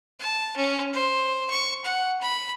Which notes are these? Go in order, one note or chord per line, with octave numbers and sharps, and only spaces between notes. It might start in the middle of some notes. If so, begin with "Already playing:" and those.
A5
C#4
C5
C#6
F#5
B5